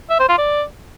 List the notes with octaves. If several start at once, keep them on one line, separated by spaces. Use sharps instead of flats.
E5
C5
F4
D5